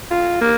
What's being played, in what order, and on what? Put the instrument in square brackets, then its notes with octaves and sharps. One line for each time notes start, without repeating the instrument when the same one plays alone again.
[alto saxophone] F4
A#3